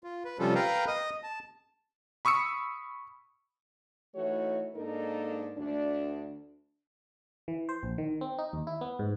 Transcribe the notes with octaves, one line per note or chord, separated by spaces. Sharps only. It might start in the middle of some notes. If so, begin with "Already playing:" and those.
F4
B4
C3 F3 G3 C#4 F4 A4
A#4 B4 F5 G5 A#5
D#5 D#6
A5
B5 C#6 D#6 E6 C#7
E3 A3 D#4 F#4 C#5
G#2 A#3 D4 D#4 A4 A#4
D2 D4
E3
C5
A#1
D#3
C4
D#4
D#2
E4
B3
G#2